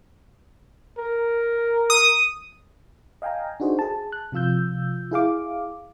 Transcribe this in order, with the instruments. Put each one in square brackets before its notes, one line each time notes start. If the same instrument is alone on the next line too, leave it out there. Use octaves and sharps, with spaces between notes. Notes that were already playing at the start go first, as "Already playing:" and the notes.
[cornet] A#4
[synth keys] D#6
[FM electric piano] D#5 F5 G5 G#5 A#5
D4 D#4 F#4 G#4 C5
G#4 A5
F#6
C3 F3 F4 E6 G6
E4 G#4 F5 D6